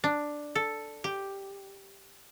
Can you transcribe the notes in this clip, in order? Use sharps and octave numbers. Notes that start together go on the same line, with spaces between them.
D4
A4
G4